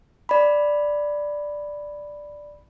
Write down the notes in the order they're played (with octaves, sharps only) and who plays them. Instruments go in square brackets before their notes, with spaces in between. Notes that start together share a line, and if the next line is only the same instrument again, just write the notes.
[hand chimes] D5 B5